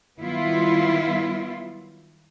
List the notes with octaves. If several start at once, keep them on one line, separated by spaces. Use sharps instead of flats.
D#3 F#3 G3 B3 E4 F4